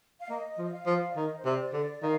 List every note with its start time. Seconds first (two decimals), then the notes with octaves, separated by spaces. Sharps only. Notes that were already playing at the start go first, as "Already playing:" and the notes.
0.20 F5
0.29 A#3 D#5
0.58 F3
0.64 D#5
0.73 F5
0.86 F3
1.11 D5
1.15 D#3 D#5
1.38 C5
1.45 C3 D5
1.62 C5
1.73 D3 D5
2.03 D#3 F5